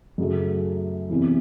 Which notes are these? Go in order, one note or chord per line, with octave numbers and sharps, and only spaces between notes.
F#2 C#3 F#3 A3
E2 C3 E3